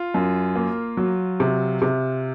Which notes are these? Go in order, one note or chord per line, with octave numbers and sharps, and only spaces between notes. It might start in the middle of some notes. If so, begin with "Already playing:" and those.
Already playing: F4
F#2
A#3
F#3
C3
C3